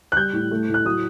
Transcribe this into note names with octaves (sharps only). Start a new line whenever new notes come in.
F#6
G3 G6
A2
A3
A2
F#6
F#3 D#6